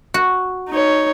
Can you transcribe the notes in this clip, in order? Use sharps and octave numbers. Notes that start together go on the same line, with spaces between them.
F#4
D#4 C#5